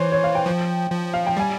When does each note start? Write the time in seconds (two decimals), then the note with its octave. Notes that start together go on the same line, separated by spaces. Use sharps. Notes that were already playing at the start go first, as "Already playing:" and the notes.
Already playing: E3 C5 C#5
0.12 C#5
0.24 F5
0.35 G5
0.46 F3
0.91 F3
1.14 F5
1.27 G5
1.37 G3 G#5